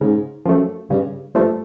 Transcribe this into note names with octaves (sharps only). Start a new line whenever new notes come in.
G#2 C#3
F#2 F3 A3
G2 C#3
G2 F3 A3